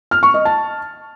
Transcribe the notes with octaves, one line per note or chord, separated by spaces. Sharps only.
F6
C#6
D#5
A5